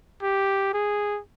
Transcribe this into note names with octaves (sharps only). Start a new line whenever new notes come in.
G4
G#4